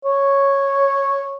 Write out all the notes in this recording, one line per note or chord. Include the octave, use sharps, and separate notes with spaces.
C#5